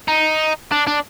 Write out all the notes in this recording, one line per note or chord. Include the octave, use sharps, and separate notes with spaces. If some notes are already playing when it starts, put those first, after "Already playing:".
D#4
D4
D4